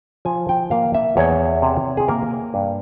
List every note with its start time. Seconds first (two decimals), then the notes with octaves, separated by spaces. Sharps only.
0.25 F3 G#5
0.49 G5
0.71 A#3 F5
0.94 E5
1.17 E2 C#5
1.62 C3
1.97 G#4
2.08 A#3 A#4
2.54 G2